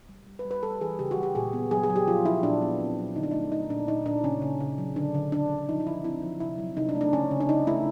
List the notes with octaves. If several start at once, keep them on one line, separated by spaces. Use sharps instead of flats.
G3
G3
B4
G3
B4
G3 A4
E3 G#4
C#3 G4
F#4
G3
G4
A#2 G#4
B3
F#3 G#4
G#4
F#3
G4
F3 F4
F3 E4
A#2 D4
B3
C4
F#3
D3 D#4
D4
A3 D#4
A3 D#4
A#2 D4
A#2 D#4
A#2 D4
C#3 C#4
C#3
C#3
F#3
D3 D4
D3
D3 D4
D3
F3 D#4
D#4
C#3 E4
C4 E4
F3
C3 E4
F#3
C3 D#4
D4
A3
D4
C#3 C#4
C#3
D4
C#3 D#4
A3 E4